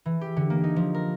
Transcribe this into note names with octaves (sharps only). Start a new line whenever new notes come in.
E3
G4
D3
A#3
D#4
F3
A#4